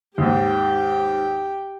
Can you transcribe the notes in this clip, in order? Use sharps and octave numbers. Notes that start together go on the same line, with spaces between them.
D#2 G#2 G4 G5